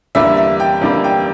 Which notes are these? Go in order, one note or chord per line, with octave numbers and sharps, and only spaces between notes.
E2 D3 G3 A#3 E5
E5
G5
E2 D3 G3 A#3
G5